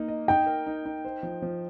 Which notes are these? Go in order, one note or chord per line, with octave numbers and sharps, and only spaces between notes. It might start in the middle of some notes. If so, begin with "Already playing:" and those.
Already playing: A#3 D#4
D#5
D#4 G5
A#4
D#4
D#4
C5
F3
F3